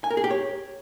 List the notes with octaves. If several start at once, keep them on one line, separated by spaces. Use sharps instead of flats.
G#5
A#4
G#4
G4
C#5